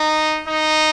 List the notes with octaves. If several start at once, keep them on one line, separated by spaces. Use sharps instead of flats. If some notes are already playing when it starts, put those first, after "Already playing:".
Already playing: D#4
D#4